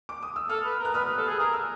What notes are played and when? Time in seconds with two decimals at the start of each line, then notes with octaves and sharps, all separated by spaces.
0.09 D6
0.23 D#6
0.36 E6
0.49 A4 D#6 F6
0.65 B4
0.80 A#4
0.85 F#6
0.94 B4 D#6 F6
1.06 B4
1.17 A4
1.28 G#4
1.40 A#4 F6
1.53 E6